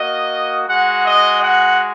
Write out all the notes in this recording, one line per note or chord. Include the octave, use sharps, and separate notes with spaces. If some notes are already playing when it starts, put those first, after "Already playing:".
Already playing: A#3 F#4 D#5
G#3 F#4 F#5
D#5
F#5